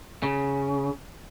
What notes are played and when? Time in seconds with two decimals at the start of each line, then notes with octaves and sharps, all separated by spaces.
0.23 C#3